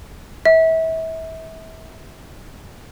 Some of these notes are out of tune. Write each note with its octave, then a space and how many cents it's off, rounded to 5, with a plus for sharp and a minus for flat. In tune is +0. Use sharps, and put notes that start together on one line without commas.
E5 -30